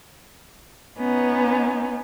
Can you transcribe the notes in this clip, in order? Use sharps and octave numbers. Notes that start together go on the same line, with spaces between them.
B3 C#4 D#4